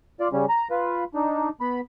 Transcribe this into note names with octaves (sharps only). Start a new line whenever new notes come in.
F4 D5
C#3 G3 C#4
A#5
F4 B4
D4 D#4
B3 B5